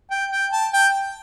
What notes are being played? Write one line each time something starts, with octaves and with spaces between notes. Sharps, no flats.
G5
G5
A5
G5